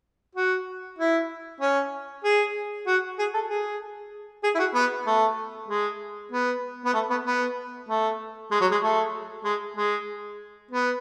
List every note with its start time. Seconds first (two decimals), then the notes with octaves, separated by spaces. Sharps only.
0.35 F#4
0.99 E4
1.61 C#4
2.24 G#4
2.86 F#4
3.19 G#4
3.34 A4
3.49 G#4
4.43 G#4
4.55 E4
4.59 F#4
4.74 B3
5.06 A3
5.68 G#3
6.32 B3
6.85 B3
6.94 A3
7.10 B3
7.25 B3
7.89 A3
8.51 G#3
8.61 F#3
8.71 G#3
8.82 A3
9.44 G#3
9.77 G#3
10.71 B3